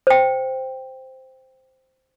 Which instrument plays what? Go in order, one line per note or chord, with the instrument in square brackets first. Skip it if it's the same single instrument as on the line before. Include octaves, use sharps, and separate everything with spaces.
[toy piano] C5 G5